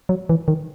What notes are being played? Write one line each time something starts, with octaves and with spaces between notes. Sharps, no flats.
F#3
E3
D#3